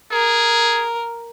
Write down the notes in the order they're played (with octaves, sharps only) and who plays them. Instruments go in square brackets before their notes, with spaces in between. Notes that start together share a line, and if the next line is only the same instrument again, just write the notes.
[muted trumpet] G#4 [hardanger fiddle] A#4